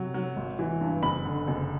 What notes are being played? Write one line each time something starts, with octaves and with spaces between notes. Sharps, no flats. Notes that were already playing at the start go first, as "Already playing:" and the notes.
Already playing: C3 F#3
F#3
G#1
E3
G2
F#1 B5
D3
F#1